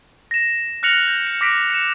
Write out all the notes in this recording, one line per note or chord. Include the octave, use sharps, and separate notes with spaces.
A#6 E7
F6 F#6 A#6 C#7 F7 F#7
G6 A#6
C#7
D6 A#6 B6 D7
C#7 E7